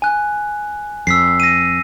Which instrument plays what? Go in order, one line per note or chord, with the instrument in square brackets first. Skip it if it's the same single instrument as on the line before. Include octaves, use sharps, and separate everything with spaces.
[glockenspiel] G#5 F#6
[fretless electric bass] F2 [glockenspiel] E6 B6 C7
[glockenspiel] A#6 D#7